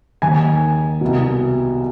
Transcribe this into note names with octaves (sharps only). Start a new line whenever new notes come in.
D#2 D#3 G#5
C2 B2